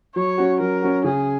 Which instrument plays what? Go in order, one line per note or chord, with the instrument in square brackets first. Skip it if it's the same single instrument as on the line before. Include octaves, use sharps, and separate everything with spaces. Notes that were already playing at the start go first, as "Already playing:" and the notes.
[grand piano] F#3 [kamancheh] C#5
[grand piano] C#4 F#4
[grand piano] F#3 [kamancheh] A#4
[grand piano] C#4 F#4
[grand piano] C#3 [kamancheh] G#4